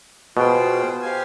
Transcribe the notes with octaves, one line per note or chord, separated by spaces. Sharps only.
B2 F4 G#4 C5 G5
G4 C5 F5 G#5